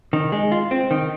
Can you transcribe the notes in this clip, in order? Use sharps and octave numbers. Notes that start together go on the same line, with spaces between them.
D#3
G#3
F4
C4
D#3